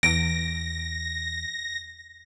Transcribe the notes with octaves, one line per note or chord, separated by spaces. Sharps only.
E2 A#6 D7